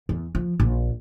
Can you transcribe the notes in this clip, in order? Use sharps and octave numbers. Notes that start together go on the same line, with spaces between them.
E2
F3
A#1